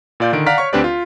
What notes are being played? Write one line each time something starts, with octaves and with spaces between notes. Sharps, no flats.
A#2 F4 D5 F5 G6
D3 D#3 D7
D5 F5 F#5 A#5 F6 B6
C#5 C#6
D2 C4 D4 G4 B4 D5
F4